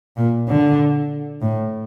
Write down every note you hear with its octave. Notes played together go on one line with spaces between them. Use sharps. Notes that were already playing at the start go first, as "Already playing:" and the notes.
A#2
D3
A2